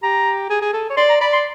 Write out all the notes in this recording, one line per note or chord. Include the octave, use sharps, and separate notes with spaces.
G4 A#5
G#4
G#4
A4
C#5
D5 C6
A#5
D5 B5
C6